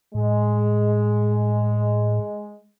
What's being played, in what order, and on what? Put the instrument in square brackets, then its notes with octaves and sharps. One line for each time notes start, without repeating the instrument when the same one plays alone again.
[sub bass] A2 [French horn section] G#3